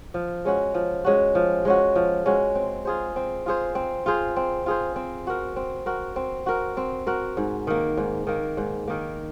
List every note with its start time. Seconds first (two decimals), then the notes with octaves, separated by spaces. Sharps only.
0.14 F3
0.45 G#3 C#4 F#4
0.74 F3
1.04 G#3 C#4 F#4
1.35 F3
1.65 G#3 C#4 F#4
1.95 F3
2.26 G#3 C#4 F#4
2.55 C4
2.85 F4 G#4 C5
3.16 C4
3.46 F4 G#4 C5
3.75 C4
4.06 F4 G#4 C5
4.36 C4
4.66 F4 G#4 C5
4.96 C4
5.27 F#4 A#4
5.56 C4
5.86 F#4 A#4
6.16 C4
6.46 F#4 A#4
6.77 C4
7.07 F#4 A#4
7.37 G#2
7.67 D#3 A#3
7.97 G#2
8.27 D#3 A#3
8.57 G#2
8.88 D#3 A#3